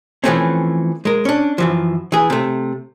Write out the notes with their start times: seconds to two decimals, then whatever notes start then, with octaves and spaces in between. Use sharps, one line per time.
0.24 E3 F3 G#3 A3 C4 C#4
1.05 G#3 A#4
1.25 C#4 D4
1.58 F#2 E3 F3
2.12 E3 G#4
2.30 C3 A3